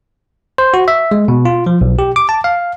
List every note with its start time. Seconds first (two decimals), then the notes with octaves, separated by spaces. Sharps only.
0.58 C5
0.74 F#4
0.88 E5
1.11 G#3
1.28 B2
1.45 F4
1.66 F3
1.81 B1
1.99 G4
2.16 D6
2.29 A5
2.44 F5